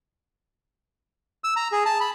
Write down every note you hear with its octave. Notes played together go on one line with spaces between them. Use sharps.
E6
A#5
G#4
A5
B5